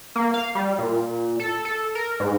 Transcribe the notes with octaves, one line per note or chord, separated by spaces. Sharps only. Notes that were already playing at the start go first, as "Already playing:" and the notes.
A#3
F5
G3
A#2
A4
A4
A#4
G#2